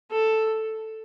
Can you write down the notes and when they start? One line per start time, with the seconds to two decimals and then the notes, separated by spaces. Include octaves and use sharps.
0.11 A4